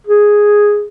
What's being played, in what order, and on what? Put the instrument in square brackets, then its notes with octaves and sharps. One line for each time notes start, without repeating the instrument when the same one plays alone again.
[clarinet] G#4